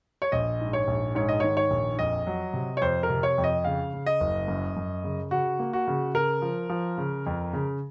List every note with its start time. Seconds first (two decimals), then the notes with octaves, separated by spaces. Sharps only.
0.22 C#5
0.32 A#1 D#5
0.60 G#2
0.73 C#5
0.88 A#1
1.15 G#2 C#5
1.29 D#5
1.40 D#3 C#5
1.57 C#5
1.71 A#1
1.99 F2 D#5
2.27 F#3
2.54 C3
2.77 C#5
2.81 F2 C5
3.03 A#4
3.10 C3
3.23 C#5
3.38 F2
3.44 D#5
3.64 C#3 F5
3.93 C#3
4.06 D#5
4.20 F#1
4.48 F#2
4.76 F#2
5.04 C#3
5.31 C#3 F#4
5.59 A#3
5.73 F#4
5.87 C#3
6.14 C#3 A#4
6.42 F3
6.70 F3
6.98 C#3
7.26 F2
7.53 C#3